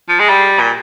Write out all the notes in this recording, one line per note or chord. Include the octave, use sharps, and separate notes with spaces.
F3
G#3
G3
A#2